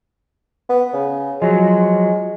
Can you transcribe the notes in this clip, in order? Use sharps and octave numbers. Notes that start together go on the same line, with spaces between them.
B3
C#3
F3 F#3 G#3